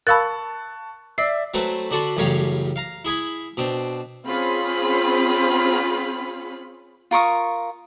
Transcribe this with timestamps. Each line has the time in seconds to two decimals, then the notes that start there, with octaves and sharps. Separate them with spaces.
0.07 A#4 F5 A5 B5 C#6 E6 F#6 A6
1.18 D5 E5 C7
1.54 F#3 A3 C4 A4 B4
1.91 D3 D4 F#4 A4 B5 C6
2.17 A1 F#2 C#3 G3 C#5 F5
2.76 F5 A#5
3.05 E4 G#4 G#5 B5
3.57 B2 C4 D4
4.26 C4 C#4 F4 G#4 B5
7.11 F4 A#4 C#6 D#6